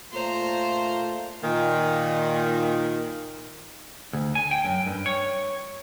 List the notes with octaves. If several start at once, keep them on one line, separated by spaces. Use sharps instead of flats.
A#2 A3 F4 C5 A#5
A#2 D#3
D2
G#5
G5
F#2
G2
C#5